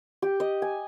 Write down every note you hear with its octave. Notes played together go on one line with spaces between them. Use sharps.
G4
D#5
G#5